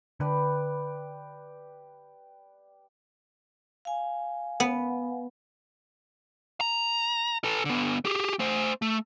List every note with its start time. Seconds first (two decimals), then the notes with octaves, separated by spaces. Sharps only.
0.20 D3 G4 B4 D5
3.85 F5 G#5
4.60 B3
6.61 A#5
7.44 A4 B4
7.65 D3 B3
8.05 G4 G#4
8.39 A3 C5
8.82 A3